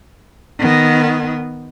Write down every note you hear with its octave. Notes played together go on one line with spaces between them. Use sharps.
D#3 B3